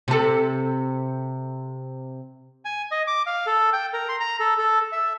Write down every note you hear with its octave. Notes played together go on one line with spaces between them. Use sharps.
C3 A4
G#5
D#5
D6
F5
A4
G5
A#4
C6
A#5
A4
A4
E5